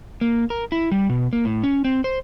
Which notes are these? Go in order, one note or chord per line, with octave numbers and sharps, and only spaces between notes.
A#3
A#4
E4
G3
B2
A#3
A2
C#4
C4
C5